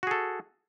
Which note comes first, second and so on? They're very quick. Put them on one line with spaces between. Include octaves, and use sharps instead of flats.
F#4 G#4 A4